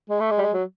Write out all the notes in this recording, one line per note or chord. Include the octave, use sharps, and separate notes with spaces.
G#3
A3
G#3
G3
G#3
F#3